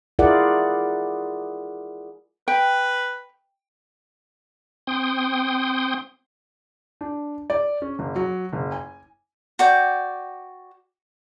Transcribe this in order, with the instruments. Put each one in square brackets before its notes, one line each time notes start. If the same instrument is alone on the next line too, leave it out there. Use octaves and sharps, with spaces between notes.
[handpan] E4 F4 G#4 A#4 D5 F#5
[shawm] B4 [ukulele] G5
[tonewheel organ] C4 G5 C6 D#6
[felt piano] D4
D5
C#4
F#1
F#3
F#1
G#5
[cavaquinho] F#4 D5 G5